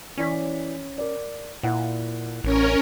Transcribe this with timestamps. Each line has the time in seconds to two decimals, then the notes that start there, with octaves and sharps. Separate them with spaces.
0.18 E3 C#4 D5 B6
0.98 A#4 D5
1.63 A#2 E4 F#5
2.44 A1 C#4 A#4 C#5